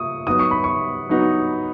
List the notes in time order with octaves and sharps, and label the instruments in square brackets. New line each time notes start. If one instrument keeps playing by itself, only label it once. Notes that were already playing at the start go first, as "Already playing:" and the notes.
Already playing: [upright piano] A#2 F4 [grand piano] C#6 D#6
[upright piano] F#3 B3 D#4 F#4 [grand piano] D#6
[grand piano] C#6
B5
C#6
[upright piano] F#3 B3 D#4 F#4